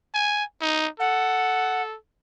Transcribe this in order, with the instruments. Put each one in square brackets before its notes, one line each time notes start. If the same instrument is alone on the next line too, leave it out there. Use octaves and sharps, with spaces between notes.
[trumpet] G#5
D#4
[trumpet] A4 [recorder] F#5